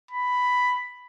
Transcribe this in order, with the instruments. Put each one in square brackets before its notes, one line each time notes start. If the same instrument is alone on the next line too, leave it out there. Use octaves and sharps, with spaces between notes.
[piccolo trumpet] B5